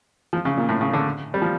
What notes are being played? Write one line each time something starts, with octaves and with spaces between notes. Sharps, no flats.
F3
C#3
A#2
A2
C#3
D3
G3
F3